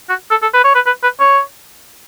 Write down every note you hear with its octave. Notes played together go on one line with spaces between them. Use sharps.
F#4
A4
A4
B4
C#5
B4
B4
B4
C#5